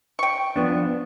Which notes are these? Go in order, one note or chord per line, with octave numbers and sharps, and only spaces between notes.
G5 C#6
F3 B3 D4